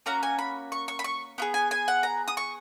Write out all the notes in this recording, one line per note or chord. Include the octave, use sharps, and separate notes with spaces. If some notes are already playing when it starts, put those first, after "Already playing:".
A#3 C#4 F#4 A#5
G#5
B5
C#6
C#6
B5
C#6
B3 F4 G#4
G#5
G#5
F#5
A#5
D#6
C#6